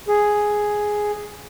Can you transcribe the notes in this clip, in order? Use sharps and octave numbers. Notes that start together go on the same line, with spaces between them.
G#4